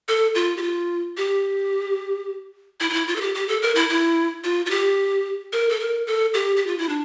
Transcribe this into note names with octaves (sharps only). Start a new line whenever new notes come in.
A4
F4
G4
F4
G4
E4
F4
E4
F4
A4
G4
G4
A4
A#4
E4
E4
F4
F4
G4
A#4
A4
A#4
A4
G4
G4
F4
E4
D4